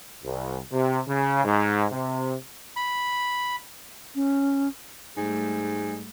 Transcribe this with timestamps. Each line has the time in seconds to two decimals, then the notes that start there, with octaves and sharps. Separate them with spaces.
0.24 C2
0.73 C3
1.07 C#3
1.44 G#2
1.91 C3
2.76 B5
4.15 C#4
5.17 G#2 G3 A3